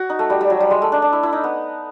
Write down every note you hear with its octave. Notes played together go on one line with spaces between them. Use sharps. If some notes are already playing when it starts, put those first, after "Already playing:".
Already playing: F#4
D#4
A3
G3
G3
F#3
G3
G#3
A3
D4
D4
E4
E4
D#4
B3